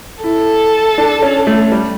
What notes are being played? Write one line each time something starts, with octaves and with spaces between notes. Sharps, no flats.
E4 A4
D4
C#4
A3
G3